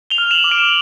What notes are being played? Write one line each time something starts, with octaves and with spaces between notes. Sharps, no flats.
F7 G7
F6
E7 F#7
D6
D7 E7